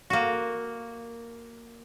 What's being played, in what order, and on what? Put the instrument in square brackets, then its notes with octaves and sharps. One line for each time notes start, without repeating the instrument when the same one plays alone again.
[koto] A#3 F#4